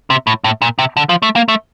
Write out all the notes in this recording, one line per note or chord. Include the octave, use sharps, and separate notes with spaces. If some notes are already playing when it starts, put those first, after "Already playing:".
C3
A2
A2
A#2
C3
D3
F3
A3
A#3
A3